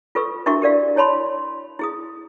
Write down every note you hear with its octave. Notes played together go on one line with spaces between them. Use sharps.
F4 A4 B4 C#6 E6
D4 E4 F#4 A#4 E5 C#6
G4 A#4 D5 F5
E4 C#5 A5 B5 C6
E4 G#4 D#6